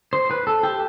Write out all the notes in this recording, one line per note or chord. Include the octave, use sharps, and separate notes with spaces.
C5
B4
A4
G4